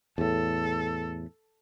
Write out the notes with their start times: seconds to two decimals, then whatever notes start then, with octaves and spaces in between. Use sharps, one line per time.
0.18 E2 A2 A4